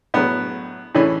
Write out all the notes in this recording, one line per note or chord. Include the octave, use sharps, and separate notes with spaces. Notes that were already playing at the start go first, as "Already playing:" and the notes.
A2 F#3 B3
A2 E3 C#4